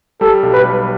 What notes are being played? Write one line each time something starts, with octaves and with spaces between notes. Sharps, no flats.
G3 A4
B1
B4
G3